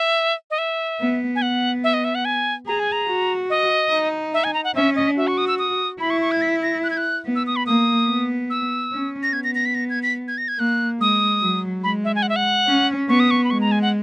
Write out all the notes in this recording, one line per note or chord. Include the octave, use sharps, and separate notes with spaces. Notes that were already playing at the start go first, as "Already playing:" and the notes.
Already playing: E5
D#5
E5
B3
G#5
B3 F#5
E5
D#5
E5
F#5
G#5
G#4 A#5
G#5
A#5
F#4
D#5
D#4
E5
G#5
A#5
F#5
C#4 E5
D#5
F#4 E5
C#6
D#6
E6
D#6
E4 B5
C#6
C#6
G#6
B6
A#6
F#6
G#6
F#6
B3
E6
D#6
B5
A#3 D#6
B3
E6
C#4
A#6
B3 G#6
A#6
A#6
B6
A#6
G#6
B6
G#6
A#6
G#6
A#3 F#6
G#3 D#6
F#3
G#3 B5
E5
G#5
F#5
E5
F#5
C#4
B3 C#6
D#6
C#6
B5
G#3 C#6
A#5
G#5
F#5